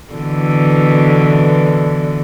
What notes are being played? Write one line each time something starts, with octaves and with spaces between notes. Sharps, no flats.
B2 D3 E3